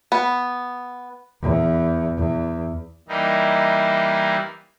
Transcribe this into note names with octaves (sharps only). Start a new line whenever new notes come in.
B3
E2
E2
E3 G3 A#3 D#4 E4